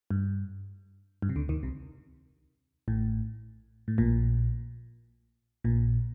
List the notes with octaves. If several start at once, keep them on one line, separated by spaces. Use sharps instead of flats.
G2
G2
C3
D2 D3
D#2 D#3
C2 C3
A1 A2
A2
A#1 A#2
A#1 A#2